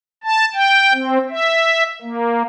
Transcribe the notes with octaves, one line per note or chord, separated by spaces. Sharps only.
A5
G5
C4
E5
A#3